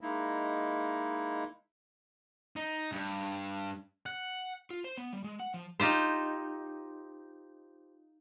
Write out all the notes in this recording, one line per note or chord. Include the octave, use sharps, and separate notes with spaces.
G#3 A#3 D#4 E4
D#4
G2
F#5
F4
C5
B3
G3
G#3
F#5
F3
D#4 F4 G4 C5